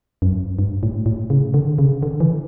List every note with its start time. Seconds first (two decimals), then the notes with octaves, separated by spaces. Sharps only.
0.22 F#2
0.59 G2
0.83 A2
1.06 A2
1.30 C#3
1.54 D3
1.78 C#3
2.03 D3
2.20 E3